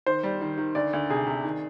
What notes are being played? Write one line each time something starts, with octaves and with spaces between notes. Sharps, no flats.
D#3 C5
G3
D#3
D#3
D2 D5
D2
C3 G#4
C3
D#3